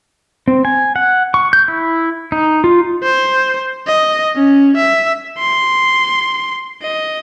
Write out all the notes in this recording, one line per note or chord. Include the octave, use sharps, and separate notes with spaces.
C4
G#5
F#5
C#6
G6
E4
D#4
F4
C5
D#5
C#4
E5
C6
D#5